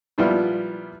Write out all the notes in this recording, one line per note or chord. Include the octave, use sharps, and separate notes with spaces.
A#2 F3 G3 B3 E4 F4